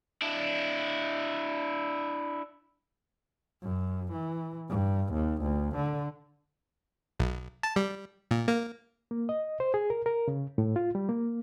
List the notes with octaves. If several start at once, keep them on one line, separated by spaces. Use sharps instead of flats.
D4 E4
F#2
E3
G2
D#2
D2
D3
B1
A5
G3
A#2
A#3
A#3
D#5
C5
G#4
A#4
A#4
C#3
A2
F4
G3
A#3